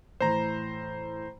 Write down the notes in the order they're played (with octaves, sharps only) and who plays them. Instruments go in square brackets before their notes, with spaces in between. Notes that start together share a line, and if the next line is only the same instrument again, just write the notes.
[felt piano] A2 E3 [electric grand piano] C5 A#5